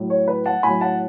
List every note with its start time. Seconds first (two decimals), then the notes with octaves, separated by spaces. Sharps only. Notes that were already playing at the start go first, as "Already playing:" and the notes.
Already playing: A2 F#3
0.10 C#5
0.28 B4
0.46 F#5 A5
0.63 A2 F#3 G#5 B5
0.81 F#5 A5